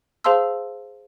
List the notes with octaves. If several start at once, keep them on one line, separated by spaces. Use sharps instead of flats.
G#4 C5 F5 A5 C6 E6